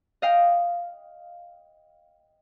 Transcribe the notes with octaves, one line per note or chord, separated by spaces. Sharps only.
D#5 F5 G5